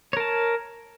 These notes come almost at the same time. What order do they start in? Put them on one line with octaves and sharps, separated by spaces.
C#5 A#4 A5